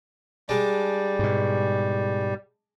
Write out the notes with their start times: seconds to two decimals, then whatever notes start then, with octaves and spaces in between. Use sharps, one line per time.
0.49 G3 G#3 D4 D5
1.19 G#2 B2